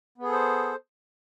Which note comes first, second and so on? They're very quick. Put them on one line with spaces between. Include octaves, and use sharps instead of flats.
B3 G#4 A4 C5